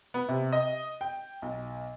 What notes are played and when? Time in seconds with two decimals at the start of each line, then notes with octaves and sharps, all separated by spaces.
0.14 B3
0.29 C3
0.52 D#5
1.01 G5
1.42 B1